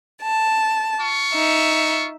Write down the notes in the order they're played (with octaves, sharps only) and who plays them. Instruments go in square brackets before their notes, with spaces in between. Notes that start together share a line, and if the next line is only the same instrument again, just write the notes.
[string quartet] A5
[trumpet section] F4 C#6
[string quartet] D#4 E5